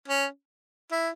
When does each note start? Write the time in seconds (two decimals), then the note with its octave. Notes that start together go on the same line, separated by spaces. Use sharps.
0.08 C#4
0.92 E4